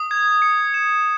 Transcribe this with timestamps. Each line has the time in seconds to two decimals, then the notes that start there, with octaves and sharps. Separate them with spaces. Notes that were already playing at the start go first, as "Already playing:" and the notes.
Already playing: D#6
0.11 G#6
0.42 C#7
0.74 E7